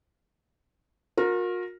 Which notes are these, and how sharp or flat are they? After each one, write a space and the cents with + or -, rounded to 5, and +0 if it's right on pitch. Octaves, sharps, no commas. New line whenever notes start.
F#4 -45 A#4 +0